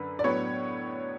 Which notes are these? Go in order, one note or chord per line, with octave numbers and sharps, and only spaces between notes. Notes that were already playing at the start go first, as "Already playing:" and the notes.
Already playing: F#2 D3 B4
D5
A2 F#3 B3 D4 C#5